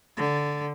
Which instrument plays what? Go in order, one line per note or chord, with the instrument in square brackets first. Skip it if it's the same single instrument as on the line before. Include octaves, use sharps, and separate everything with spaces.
[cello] D3